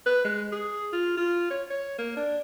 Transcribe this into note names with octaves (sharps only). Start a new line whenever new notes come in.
B4
G#3
G#4
F4
F4
C#5
C#5
A#3
D4